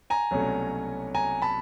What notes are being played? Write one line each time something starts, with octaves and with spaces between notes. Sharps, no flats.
G#5 A#5
C2 B2 F#3 A3 C#4
G#5 A#5
A5 B5